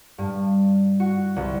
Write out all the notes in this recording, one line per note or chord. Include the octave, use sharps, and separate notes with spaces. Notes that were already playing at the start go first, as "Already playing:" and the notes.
G2
F#4
C2